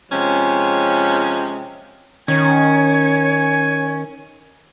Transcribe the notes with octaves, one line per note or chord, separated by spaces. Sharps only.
C3 F3 G#3 C#4
D#3 C#4 C#5 G#5